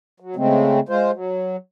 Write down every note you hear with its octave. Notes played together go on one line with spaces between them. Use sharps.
F#3
C#3 G#3 A3 C4
G#3 F4 C5
F#3